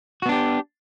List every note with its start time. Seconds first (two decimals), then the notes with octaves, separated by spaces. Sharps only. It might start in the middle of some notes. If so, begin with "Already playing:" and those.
0.22 F#4
0.26 B3
0.29 D4
0.32 G4